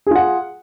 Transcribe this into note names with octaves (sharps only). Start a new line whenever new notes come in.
F4 G#4 F#5